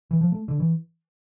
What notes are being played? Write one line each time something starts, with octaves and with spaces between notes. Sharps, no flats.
E3
F3
A3
D3
E3